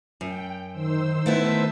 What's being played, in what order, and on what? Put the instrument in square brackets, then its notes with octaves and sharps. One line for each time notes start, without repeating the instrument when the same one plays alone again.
[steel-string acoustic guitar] F#2 [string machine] G5
[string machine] D#3 C5 E6
[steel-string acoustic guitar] A3 B3 E4